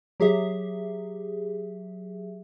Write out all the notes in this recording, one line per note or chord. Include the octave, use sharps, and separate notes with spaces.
F#3 G4 G#4 E5